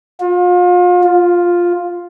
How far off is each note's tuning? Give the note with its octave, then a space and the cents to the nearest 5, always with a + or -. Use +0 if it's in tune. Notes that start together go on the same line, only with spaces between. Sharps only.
F4 +35
F4 +5